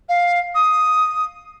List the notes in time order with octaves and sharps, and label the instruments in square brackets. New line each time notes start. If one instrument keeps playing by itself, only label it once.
[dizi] F5
D#6